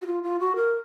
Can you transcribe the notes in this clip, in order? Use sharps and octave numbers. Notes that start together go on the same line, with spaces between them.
F#4
F4
F4
F#4
A#4